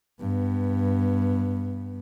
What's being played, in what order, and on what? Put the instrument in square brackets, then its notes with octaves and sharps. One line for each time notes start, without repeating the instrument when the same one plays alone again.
[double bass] G2 B3